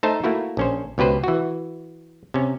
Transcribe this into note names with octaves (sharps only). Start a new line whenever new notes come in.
A3 D#4 C5 E5 A5
A3 A#3 E4 F#4
A#1 C#4 C5
C#2 B2 G4 B4 C5
E3 F#4
C3 C#4